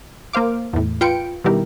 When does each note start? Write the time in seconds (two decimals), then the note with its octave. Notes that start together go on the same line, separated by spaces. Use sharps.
0.33 A#3 C5 F5 D6
0.73 E2 A2
1.01 F4 B4 G5 C#7 D7
1.44 B2 D#3 G3 E4 G4 A#4